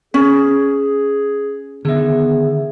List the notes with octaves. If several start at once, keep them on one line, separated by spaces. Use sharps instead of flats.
C#4 G#4
D3 D#3 B3 G#4 E5